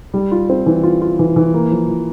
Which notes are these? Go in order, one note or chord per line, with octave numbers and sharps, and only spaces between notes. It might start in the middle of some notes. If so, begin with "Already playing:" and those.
G3
F4
C4
E3
F4
F4
E3
E3
A#3
F3
F3